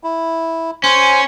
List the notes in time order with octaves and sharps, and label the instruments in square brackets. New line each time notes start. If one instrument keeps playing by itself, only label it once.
[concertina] E4
[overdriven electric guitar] C#4 [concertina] C5 G#5